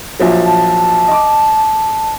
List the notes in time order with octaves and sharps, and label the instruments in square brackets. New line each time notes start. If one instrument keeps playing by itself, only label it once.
[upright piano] A#1 F3 F#3
[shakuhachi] A5
[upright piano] D#5 D6